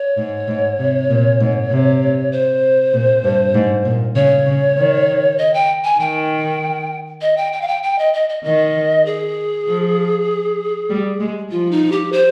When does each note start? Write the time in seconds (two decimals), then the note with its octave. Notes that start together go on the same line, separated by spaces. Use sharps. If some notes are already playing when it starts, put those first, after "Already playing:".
Already playing: C#5
0.18 G#2
0.48 G#2
0.79 C3
1.10 A#2
1.40 G#2
1.71 C3
2.32 C5
2.93 A#2
3.24 G2
3.55 G#2
3.85 A#2
4.16 C#3 C#5
4.46 C#3
4.77 D#3
5.38 D#5
5.54 G5
5.84 G#5
6.00 D#3 G5
7.21 D#5
7.37 G5
7.53 G5
7.62 F5
7.68 G5
7.83 G5
7.99 D#5
8.14 D#5
8.29 D#5
8.44 D#3 D#5
9.06 G#4
9.67 F3
10.90 G3
11.20 G#3
11.51 F3 F4
11.71 D#4
11.92 G4
12.12 C5